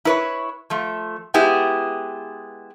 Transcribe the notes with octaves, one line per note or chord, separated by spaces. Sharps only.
E4 B4 C#5
F3 A3
G#3 B3 E4 G4 G#4